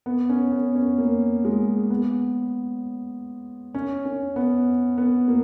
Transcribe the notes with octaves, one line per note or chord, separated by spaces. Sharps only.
B3
C#4
B3
C#4
A#3
G#3
B3
C#4
C#4
B3
B3
A#3